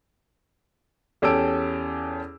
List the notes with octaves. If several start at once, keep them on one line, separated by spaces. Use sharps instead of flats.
E2 C#4 G4 A4 E6 D7